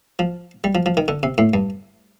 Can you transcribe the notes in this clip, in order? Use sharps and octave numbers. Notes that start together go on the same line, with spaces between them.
F3
G3
F3
F3
D#3
D3
C3
A2
G2